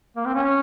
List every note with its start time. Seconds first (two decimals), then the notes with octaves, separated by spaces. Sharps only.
0.16 A#3
0.25 C4
0.35 C#4